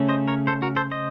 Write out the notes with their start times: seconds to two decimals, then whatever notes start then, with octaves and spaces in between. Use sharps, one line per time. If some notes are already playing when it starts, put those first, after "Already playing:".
Already playing: C#3 A3 C#4
0.09 C5 D#5
0.28 A#4 C#5
0.47 A4 C5
0.62 F#4 A#4
0.76 A4 C5
0.91 C5 D#5